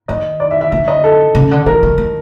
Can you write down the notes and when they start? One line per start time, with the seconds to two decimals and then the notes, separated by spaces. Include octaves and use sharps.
0.08 D#3 D#5
0.40 D5
0.51 E5
0.61 E5
0.72 D3 E5
0.88 D#5
1.04 A4
1.35 C#3
1.51 D3
1.66 E3 A#4
1.83 D#3
1.98 D#3